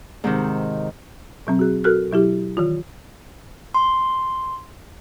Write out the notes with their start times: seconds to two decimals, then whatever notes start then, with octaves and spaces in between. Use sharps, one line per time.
0.24 G#2 C3 D#3
1.47 B2 F#3 C4
1.59 F#4 G#4
1.84 F#4 A4 A#4 F6 F#6
2.11 B2 F#3 E4 G4
2.57 D#3 E3 F4
3.74 C6